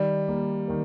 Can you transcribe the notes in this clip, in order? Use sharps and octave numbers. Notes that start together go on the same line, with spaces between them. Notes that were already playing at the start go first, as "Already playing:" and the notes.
Already playing: D#3 G3
G3 A#3
D#3 A#3